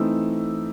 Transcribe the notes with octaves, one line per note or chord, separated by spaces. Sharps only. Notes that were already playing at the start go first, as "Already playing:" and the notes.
Already playing: E3 A3 C4 D#4 E6